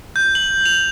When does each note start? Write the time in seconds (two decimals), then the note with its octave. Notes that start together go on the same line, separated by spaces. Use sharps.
0.16 G6
0.35 F#7
0.65 F7